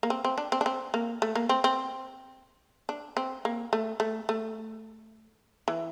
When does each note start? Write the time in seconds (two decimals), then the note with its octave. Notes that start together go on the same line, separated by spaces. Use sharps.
0.03 A#3
0.10 C4
0.25 C4
0.38 D4
0.52 C4
0.61 D4
0.66 C4
0.94 A#3
1.22 A3
1.35 A#3
1.49 C4
1.64 C4
2.89 D4
3.17 C4
3.45 A#3
3.73 A3
4.00 A3
4.29 A3
5.68 E3